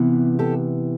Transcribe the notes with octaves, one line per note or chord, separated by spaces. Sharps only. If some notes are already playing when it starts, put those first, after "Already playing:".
Already playing: C3 E3 B3
G4 A4